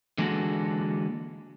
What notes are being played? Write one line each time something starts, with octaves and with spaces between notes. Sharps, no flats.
D3 E3 G#3 A#3 F#4 A4